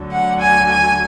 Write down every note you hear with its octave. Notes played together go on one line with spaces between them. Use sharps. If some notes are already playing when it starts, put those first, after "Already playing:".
Already playing: D2 D3 F#3
F#5
G#5
G#5